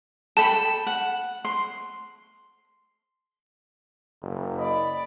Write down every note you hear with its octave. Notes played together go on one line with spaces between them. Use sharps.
A4 G5 A5 B5
F#5
C6
F#1
D5 D#5 B5